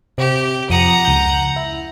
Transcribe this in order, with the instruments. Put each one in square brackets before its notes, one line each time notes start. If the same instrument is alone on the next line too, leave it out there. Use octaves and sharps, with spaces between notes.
[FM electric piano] C3 [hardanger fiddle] G4
[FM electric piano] F2 D#6 C#7 [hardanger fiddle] F#5 A#5
[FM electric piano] C#2 G6
E4